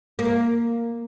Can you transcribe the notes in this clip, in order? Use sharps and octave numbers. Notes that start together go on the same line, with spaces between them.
A#3